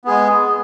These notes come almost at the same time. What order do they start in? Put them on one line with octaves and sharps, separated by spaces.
B3 G#4 G#3